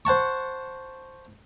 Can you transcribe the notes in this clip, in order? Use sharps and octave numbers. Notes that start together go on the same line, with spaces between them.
C5 F#5 A5 C#6